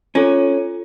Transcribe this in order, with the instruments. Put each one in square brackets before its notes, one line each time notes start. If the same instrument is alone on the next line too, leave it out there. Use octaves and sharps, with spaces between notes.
[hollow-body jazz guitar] C#4 [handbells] F4 A4 C#5